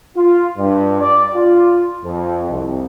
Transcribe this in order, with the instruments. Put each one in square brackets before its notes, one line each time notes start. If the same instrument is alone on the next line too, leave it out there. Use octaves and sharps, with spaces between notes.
[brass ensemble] F4
G2
D5
F4
F2
C2